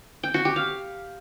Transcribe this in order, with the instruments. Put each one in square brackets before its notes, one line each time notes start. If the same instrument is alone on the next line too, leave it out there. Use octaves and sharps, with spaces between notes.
[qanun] G5
F#4
G4
F5